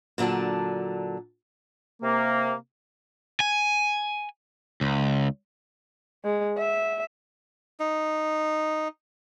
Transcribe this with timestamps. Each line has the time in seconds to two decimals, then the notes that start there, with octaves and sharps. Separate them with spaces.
0.18 A#2 D3 F#3 D4 A5
2.03 C3 A#3
3.40 G#5
4.81 C#2
6.24 G#3
6.58 E5
7.80 D#4